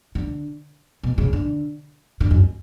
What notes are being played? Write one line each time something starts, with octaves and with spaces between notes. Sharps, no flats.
D3
B2
C#3
D3
D3
F#2